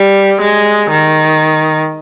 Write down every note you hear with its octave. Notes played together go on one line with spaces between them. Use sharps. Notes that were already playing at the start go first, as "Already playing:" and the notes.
Already playing: G3
G#3
D#3